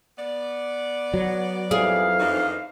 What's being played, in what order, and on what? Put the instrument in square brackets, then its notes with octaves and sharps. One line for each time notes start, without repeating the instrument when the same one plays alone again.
[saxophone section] B3 D5
[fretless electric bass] F#3
[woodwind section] F2 E3 F5 [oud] G#4
[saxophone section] F#2 D4 D#4